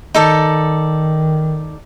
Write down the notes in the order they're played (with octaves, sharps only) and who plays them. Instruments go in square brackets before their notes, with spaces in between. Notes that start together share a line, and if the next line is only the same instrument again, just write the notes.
[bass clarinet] D#3 [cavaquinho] D#4 A4 D5